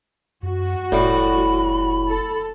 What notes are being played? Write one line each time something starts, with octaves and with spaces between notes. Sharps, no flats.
F#2 F#4
F1 A2 G3 B5
A4